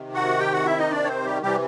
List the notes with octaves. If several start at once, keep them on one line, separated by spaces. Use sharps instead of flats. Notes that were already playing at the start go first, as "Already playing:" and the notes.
Already playing: C3 D#3
F#4 F#5
G4 G5
F#4 F#5
E4 E5
D#4 D#5
D4 D5
C#5
C4 C5
G3 G4
C3 E3 G3 G4